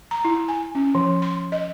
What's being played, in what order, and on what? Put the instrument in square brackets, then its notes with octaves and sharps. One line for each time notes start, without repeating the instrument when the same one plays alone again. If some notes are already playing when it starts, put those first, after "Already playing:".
[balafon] A#5
E4
G#5
C#4
F3
C6
D#5